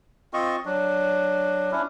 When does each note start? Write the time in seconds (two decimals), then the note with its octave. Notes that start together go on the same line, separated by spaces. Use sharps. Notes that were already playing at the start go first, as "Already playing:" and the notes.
0.33 C4 F4 D#5 C#6
0.65 F#3 D4
1.72 C#4 D4 E4